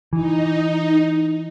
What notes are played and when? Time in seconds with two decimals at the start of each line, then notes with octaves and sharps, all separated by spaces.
0.13 E3 D#4